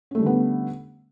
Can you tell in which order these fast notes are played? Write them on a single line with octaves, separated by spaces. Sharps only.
C#4 A3 G3 D3 B3